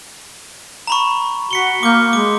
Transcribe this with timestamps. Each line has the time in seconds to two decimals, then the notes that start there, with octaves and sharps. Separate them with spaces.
0.87 A#5 B5 C#6
1.51 F#4 B6 C#7 G7
1.83 A#3 D6 G6
2.13 G#3 D6